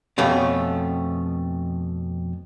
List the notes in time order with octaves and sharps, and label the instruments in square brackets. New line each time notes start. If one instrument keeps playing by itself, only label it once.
[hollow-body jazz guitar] F2 B2 A3 C#4